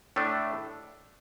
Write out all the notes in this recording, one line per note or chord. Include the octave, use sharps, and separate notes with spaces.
A2 A3 D4